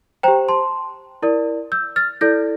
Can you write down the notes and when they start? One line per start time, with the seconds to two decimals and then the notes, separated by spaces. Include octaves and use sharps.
0.23 C5 G5 A#5
0.28 G4
0.49 A5 C6
1.22 E4 A#4 D5
1.72 E6 G6
1.96 F6 A6
2.21 E4 A4 D5 G6 A#6